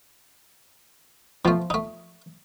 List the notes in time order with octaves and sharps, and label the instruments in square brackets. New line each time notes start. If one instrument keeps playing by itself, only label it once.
[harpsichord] B2 A3 [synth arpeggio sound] F3 F4
[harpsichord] A3 D#4